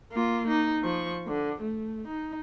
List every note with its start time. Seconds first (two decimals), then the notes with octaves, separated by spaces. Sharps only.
0.12 A#3 F4
0.48 D#4
0.83 F3 C#6
1.27 D3
1.61 A3
2.08 D#4